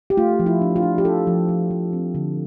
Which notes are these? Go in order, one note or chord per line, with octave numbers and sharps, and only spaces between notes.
G4
A3 F4
F3
E4
D4
F4
D4
G4
D4 A4
F3
F3
F3
C4
D3